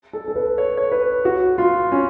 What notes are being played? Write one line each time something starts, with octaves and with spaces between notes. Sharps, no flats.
A4
A4
B4
C#5
C#5
B4
F#4
F4
C#4